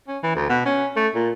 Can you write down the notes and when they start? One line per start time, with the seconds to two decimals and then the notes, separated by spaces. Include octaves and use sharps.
0.08 C#4
0.23 E3
0.36 D2
0.49 B2
0.65 C#4
0.96 A3
1.15 A#2